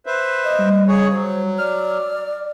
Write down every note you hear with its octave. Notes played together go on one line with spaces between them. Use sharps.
B4 C5 E5
D#5
G3
C#3 G#4 C#5 C#6
F#3 C5
D5 F6